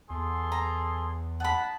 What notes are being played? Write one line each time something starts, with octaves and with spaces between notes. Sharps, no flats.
E2 G#4 A4 C6
A#5
D#4 F#5 A5 B5